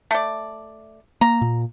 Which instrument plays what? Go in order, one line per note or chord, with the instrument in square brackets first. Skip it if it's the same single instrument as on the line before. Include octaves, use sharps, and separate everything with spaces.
[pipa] A3 D5
[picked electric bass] A#3 [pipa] A#5
[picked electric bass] A#2